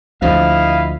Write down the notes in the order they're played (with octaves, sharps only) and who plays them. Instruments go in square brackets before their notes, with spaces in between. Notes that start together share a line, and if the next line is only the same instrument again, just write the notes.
[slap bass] D2 F3 [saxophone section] E4 D#5 F5